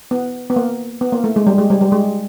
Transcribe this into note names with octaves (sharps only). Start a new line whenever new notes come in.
B3
B3
A#3
B3
A#3
A3
G#3
G3
G#3
G3
G3
G#3